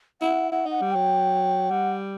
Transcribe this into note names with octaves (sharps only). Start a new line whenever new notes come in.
E4 F#5
E4 F#5
D#4 F#5
G3
F#3 G5
G3 F#5